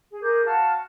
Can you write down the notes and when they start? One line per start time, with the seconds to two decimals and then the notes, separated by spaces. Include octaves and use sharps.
0.10 G#4
0.22 G#4 A#4 D6 G6
0.45 F#4 F5 A5 F6